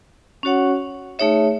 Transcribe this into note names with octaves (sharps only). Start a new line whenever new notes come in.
C#4 F#4 C#5 F#5
A3 D#4 G#4 C#5 E5